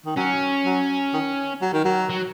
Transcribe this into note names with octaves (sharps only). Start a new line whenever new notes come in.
D#3
F#3 C#4
F#3
D#3
F#3
D#3
F#3
F#3